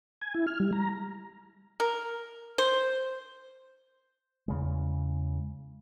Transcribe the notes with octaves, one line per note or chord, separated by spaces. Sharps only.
G#5
E4
F6
G3
A#5
A#4
C5
E2 C#3 G#3